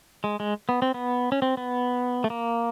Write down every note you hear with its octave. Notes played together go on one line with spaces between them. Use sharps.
G#3
G#3
B3
C4
B3
C#4
C4
B3
A3
A#3